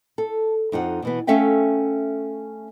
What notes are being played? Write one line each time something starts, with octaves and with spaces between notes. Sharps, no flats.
A4
F2 D#4 F4 F#5
B2 E3 B3
A3 C#4 A4 E5 F5 G5